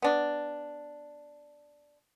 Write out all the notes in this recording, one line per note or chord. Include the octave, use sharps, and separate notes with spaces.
B3 D4